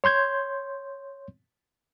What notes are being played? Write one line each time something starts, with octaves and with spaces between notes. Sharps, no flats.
C#5 C6 G6 G#6